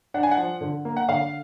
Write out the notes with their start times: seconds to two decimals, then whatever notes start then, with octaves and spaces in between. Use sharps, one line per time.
0.14 D4 F#5
0.23 G#5
0.31 F#5
0.38 F3
0.61 D3
0.85 A#3
0.97 F#5
1.08 D3 F5